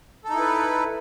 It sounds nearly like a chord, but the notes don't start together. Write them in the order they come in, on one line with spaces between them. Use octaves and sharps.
A4 D#4 E4 B4